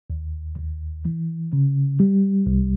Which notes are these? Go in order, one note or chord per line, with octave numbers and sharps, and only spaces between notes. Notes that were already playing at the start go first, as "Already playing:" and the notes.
D#2
D#2
E3
C#3
G3
C2